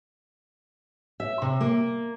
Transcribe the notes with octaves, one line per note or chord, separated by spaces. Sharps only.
E5
C3
A#3